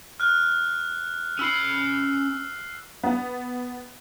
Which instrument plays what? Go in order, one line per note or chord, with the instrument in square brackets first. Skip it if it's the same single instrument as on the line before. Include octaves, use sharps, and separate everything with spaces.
[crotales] F6 F#6
[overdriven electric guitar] C#4 B5 [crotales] E6 C7
[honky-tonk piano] B3